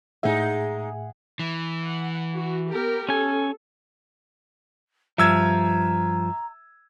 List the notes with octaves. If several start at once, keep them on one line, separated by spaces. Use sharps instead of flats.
A2 G#3 D#4 G#4 E5 F#5
E3
F#5
F#4
B3 G4 A#4
C#4 A4 G#5
G2 F3 E5 A#5 E6 G#6